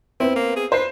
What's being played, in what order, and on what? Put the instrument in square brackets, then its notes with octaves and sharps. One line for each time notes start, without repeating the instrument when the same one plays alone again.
[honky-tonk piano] B3 C4 [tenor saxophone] E4
[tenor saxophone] A#3
G#4
[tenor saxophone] B4 [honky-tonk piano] C5 C7